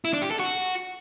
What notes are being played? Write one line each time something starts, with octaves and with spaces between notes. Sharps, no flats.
E4
D4
G4
A4
F#4